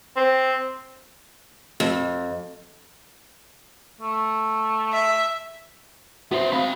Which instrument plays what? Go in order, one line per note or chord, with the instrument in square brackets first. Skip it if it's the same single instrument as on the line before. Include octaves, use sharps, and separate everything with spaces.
[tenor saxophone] C4
[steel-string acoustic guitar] F2
[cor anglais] A3
[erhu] E5
[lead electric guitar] B3 C5 [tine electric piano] F#4 [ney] E5
[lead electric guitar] C4 B5 [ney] F5